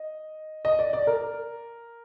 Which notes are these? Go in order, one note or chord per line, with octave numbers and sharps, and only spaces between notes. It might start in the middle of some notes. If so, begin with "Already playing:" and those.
Already playing: D#5
D#5
D5
D5
A#4